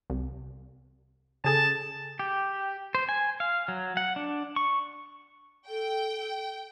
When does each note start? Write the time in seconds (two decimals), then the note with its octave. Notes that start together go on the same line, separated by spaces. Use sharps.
0.10 C2
1.44 C#3 G#4 A4 A5
2.19 G4
2.95 C5
3.09 G#5
3.40 F5
3.68 F#3
3.97 F#5
4.16 D4
4.56 C#6
5.69 A4 G5